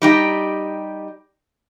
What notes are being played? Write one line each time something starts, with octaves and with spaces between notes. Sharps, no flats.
G3 D#4 G4